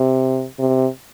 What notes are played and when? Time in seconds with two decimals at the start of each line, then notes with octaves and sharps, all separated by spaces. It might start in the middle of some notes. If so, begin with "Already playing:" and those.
Already playing: C3
0.59 C3